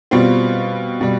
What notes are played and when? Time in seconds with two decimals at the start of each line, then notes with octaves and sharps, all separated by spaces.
0.11 B2 G3 C4 F4 F5
1.01 B2 G3